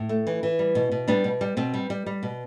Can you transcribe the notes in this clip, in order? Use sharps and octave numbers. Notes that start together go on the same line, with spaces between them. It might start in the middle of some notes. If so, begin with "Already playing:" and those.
Already playing: A2
A3
E3
E3
G3
B2
B2
G3 B3 D4
B2
G3
B2 C4
G3
G3
G3
B2